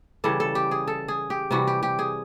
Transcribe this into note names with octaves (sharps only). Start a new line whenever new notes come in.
C#3 E3 G3 A4
A4
G4
G#4
A4
G#4
G4
C3 E3 G3 F#4
G4
G4
G#4